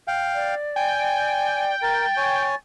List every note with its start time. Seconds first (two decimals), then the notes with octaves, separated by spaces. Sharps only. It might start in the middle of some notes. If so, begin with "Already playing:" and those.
0.08 F5 G5
0.35 D5
0.76 G5 G#5
1.82 A#4 A6
2.17 C#5 G#5